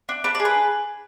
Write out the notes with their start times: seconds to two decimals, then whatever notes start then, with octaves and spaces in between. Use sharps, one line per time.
0.09 D4
0.24 D4 B4
0.35 D5
0.40 G#4
0.45 B4